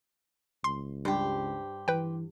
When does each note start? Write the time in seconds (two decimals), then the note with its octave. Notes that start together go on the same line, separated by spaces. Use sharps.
0.64 C#2 C6
1.05 G2 G4 C5
1.88 E3 B4 G5